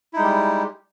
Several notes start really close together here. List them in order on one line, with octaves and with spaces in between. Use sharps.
E4 D#4 G#3 G3 G4